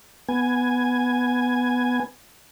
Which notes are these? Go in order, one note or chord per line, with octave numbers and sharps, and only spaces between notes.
B3 G#5